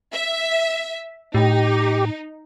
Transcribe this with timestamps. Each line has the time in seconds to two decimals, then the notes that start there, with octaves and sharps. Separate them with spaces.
0.12 E5
1.35 A2 D#4 G4